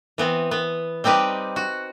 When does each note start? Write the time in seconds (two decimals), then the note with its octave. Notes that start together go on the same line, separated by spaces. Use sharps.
0.18 E3 B3 C4
0.51 B3
1.04 G3 C4 D#4 G4 B4
1.56 F#4